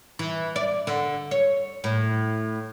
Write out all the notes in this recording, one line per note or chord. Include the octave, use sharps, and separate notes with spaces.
E3
D5
D3
C#5
A2